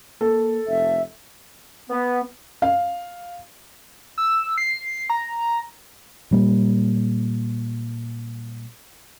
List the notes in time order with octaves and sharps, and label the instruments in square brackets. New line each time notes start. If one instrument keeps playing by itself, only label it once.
[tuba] A#3 [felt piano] A4
[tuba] F1 [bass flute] E5
[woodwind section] B3
[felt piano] F5
[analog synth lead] E6
C7
A#5
[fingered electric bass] A#2 F#3 G3 A#3